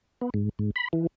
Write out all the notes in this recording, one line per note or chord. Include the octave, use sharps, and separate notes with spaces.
B3
G#2
G#2
B5
E3